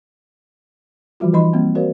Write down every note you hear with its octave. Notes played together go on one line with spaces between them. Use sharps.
E3 F3 G3 F4 F#4
E3 D#4 D#5 B5 C6
G3 A#3 C4
F#4 A#4 C5 D5 F5